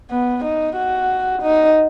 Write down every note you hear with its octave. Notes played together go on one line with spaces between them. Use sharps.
B3
D#4
F#4
D#4